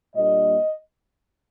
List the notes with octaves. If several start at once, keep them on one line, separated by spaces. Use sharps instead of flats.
A#2 G3 A#3 D4 D#5